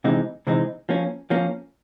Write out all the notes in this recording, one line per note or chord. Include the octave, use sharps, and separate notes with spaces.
C3 E3 G#3 C4 D#4
C3 E3 G#3 C4 D#4
F3 A#3 C#4
F3 A#3 C#4